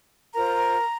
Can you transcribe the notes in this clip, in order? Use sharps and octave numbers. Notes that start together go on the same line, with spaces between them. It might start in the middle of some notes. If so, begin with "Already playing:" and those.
F4 A#4 C5 A#5